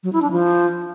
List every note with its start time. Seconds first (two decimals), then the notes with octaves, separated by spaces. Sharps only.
0.03 F#3
0.13 E4
0.22 D4
0.31 F3